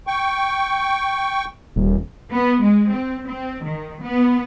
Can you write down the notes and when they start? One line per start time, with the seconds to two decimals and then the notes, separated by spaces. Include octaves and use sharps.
0.07 G5 C#6
1.76 D#1
2.33 B3
2.61 G#3
2.91 C4
3.28 C4
3.63 D#3
4.03 B3